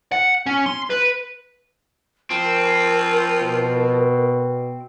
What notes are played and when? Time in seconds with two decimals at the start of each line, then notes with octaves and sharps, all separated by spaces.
0.12 F#5
0.46 C#4
0.66 C6
0.90 B4
2.30 F3 C4 A#4
3.42 B2